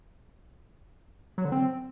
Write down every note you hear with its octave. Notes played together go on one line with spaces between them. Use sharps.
F#3
D3
C4